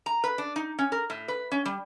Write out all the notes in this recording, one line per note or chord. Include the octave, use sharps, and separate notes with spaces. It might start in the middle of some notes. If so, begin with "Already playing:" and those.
A#5
B4
D4
D#4
C#4
A#4
A2
B4
C#4
G3